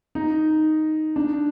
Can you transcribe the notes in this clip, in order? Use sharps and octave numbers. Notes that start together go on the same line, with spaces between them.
D#4
D4